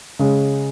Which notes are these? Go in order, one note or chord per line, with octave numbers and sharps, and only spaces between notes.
C#3 G#3